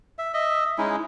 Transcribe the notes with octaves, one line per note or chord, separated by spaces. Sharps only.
E5
D#5 E5
G#3 C#4 D#4 E4